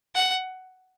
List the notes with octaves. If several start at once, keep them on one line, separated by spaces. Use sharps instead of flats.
F#5